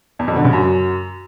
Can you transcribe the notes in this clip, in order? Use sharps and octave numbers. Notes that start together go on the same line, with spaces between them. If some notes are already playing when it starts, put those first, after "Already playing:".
E2
F2
D3
C#3
F#2